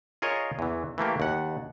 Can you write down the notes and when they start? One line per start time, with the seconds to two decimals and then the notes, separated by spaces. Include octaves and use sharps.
0.22 F4 G#4 A#4 C#5 D#5
0.59 E2 E3
0.98 E3 A3 A#3 G4
1.20 D#2 F#5